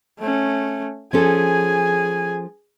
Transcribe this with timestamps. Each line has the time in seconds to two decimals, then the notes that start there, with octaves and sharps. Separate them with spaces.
0.19 A3 C#4
1.13 F3 C#4 G#4 A4 G#5